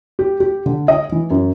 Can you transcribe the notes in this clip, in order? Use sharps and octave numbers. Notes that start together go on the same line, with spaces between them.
G4
G4
D3
D#5
E3
F#2